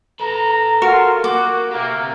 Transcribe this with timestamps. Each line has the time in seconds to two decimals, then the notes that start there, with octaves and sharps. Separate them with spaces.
0.20 A4 B4 A#5
0.82 F4 F#4 A#4
1.24 A#3 F#4 D6
1.71 A#3 G4 E5